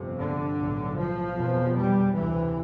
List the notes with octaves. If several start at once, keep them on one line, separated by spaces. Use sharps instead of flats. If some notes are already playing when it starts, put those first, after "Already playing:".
Already playing: G1 F2 C3
D3
B1 A2
F3
F1 E2 B2
G3
D2 C3 E3